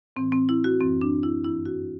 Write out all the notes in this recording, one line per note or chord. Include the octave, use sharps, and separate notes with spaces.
A2 E3 C4
C4
E4
F#4
F#2 E3 C4
D4
E4
G2 E3 E4
F#4